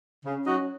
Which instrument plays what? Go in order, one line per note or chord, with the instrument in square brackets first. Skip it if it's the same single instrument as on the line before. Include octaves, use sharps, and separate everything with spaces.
[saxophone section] C#3 [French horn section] C#4
[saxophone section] F#3 D#4 F#4